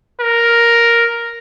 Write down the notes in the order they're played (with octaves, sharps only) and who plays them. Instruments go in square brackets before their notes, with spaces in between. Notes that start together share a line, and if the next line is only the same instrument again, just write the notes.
[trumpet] A#4